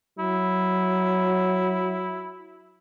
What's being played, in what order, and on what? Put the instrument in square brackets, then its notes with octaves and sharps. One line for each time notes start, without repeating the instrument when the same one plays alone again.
[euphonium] F#3 [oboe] E4